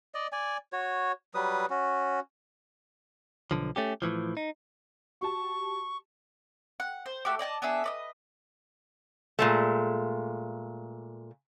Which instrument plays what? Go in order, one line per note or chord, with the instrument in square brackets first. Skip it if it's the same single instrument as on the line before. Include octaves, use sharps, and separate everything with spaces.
[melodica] D5 D#5
D5 G#5
F#4 C#5
F#3 G3 B4 D#6
C#4 F#4
[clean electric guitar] B1 D3 F3
A3 C#4 G4
A2 E3 F3
D#4
[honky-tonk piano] F#4 G4 A5 [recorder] C#6
[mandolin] F#5
C5
A3 F#4 G4 D6
D5 D#5 G5 A5
B3 D4 G#4 E5
B4 D5 D#5
[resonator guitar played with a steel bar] A#2 G#3 A3